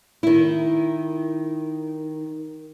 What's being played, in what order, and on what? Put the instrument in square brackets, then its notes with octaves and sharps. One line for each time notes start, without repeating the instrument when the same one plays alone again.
[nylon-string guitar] D#3 E4